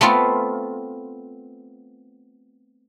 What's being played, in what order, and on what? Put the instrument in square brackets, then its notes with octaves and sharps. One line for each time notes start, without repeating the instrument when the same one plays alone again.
[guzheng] A3 B3 C4 F4